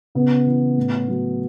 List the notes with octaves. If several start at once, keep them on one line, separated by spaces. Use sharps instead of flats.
C#3 B3
E3
A2
F#3